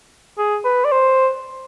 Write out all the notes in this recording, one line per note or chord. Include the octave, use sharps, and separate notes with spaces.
G#4
B4
D5
C5